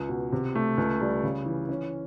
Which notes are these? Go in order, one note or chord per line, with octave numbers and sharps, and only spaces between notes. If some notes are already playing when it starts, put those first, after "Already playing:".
Already playing: C#2
B2
C3
A3
C#2
G3
C#3
E3
C#4